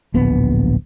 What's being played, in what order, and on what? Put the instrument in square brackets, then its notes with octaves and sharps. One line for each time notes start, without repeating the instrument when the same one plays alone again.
[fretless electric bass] D1 A#1 B3